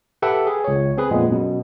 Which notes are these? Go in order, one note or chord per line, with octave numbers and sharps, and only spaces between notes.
G4 A4 B4 E5 F#5 G5
G#4
C#2 C#5
C4 G#4 B4
F2 A#2 G#3 B3
F#2 B2